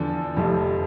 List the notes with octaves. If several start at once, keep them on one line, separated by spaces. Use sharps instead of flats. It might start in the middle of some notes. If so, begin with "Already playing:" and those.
Already playing: E2 D3 F3 A5
F1 F2 C3 F3